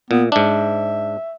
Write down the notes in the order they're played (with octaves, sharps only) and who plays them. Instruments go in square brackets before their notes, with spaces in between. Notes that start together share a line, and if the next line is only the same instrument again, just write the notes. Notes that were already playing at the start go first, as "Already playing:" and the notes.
[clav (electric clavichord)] A#2 [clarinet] B3
[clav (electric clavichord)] G#2 D4 [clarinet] E5